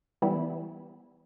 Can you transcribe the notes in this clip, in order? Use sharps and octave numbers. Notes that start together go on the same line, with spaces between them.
E3 G3 B3 E4